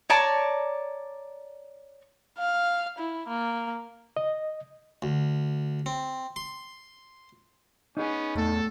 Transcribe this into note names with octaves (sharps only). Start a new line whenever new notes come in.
C#5 D5 A5 A#5
F5
E4
A#3
D#5
D2
C4
C6
B3 C#4 D#4 G#4
E2 A2 A4